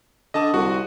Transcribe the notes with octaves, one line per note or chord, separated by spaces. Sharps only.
D3 D#5 A5 D#6
C2 F#4